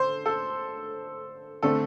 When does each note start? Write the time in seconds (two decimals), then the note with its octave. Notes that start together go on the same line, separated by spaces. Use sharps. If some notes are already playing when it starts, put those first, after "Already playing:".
Already playing: D3 A4 C5
0.26 A4
1.62 D3 A3 C4 A4